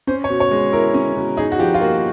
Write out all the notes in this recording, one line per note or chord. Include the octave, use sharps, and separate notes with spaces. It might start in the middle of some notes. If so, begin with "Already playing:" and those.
C#4 C5
C#5
B2
C#5
G#3
E4 A#4
C#4
B2
D#4 G#4
F#4
F3 G4
F4
A#3 F#4